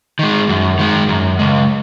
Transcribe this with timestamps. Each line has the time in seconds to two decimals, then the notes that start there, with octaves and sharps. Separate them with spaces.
0.19 D#3 G#3
0.49 F#2
0.79 D#3 G#3
1.09 F#2
1.39 C#3 G#3